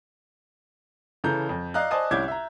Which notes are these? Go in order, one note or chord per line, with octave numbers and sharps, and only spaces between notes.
C#3 E3 A4 A#5 G6
F2
D5 D#5 F5 A#5 F#6
C5 D5 D#5 G#5 A5 D#6
C2 C#4 E4 D6 G6 G#6
E5 A#5